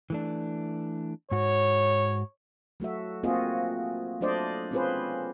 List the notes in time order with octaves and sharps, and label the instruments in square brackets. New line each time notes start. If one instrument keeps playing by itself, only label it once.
[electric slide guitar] E3 A3 D4
[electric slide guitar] G#2 F#4 [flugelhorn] C#5
[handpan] F#3 A3 F#4 E5
A#3 C4 F4 F#4 G#4 D#5
F#3 A3 D4 C5 D5 D#5
C4 C#4 F4 G#4 B4 C5